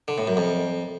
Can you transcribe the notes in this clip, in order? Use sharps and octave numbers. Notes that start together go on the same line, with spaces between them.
D3
A2
F#2
F2